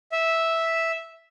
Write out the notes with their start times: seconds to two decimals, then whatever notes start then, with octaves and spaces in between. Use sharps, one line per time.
0.12 E5